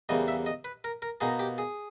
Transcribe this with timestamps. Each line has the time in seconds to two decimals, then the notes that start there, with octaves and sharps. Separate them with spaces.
0.09 E2 C#3 G3 A#3 D#5
0.28 E5
0.46 D#5
0.64 B4
0.84 A#4
1.02 A#4
1.21 B2 A#3 D#4 G#4
1.39 G4
1.58 G#4